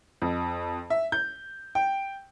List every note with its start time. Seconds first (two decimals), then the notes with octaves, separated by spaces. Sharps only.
0.22 F2
0.90 E5
1.12 G6
1.75 G5